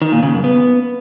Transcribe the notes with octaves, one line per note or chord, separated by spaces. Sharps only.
D#3
A#2
C#3
F#2
B3